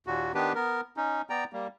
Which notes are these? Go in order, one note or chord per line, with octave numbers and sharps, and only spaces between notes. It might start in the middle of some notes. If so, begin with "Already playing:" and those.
D#2 A#2 F#4
D#3 B3 D4 G4 B4
B3 A#4
C#4 D#4
B3 D5 G5 A#5
G3 A#3